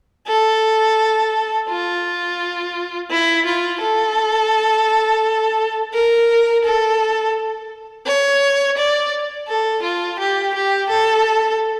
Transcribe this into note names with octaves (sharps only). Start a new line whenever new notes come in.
A4
F4
E4
F4
A4
A#4
A4
C#5
D5
A4
F4
G4
G4
A4